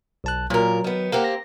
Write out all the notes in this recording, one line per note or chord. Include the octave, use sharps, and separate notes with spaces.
B1 A5 F#6
A#2 F#3 A#4
D#3 B3
A#3 C4 G4 A#4 F#5
A#6